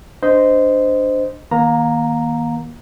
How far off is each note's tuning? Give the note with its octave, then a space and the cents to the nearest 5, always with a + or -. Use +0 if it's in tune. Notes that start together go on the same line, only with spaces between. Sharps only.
D4 +0 C5 -10 D#5 +0
D#3 +25 A#3 +25 A#5 -5